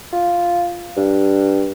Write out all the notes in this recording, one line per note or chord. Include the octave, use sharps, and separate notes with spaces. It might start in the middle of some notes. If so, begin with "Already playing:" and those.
F4
G2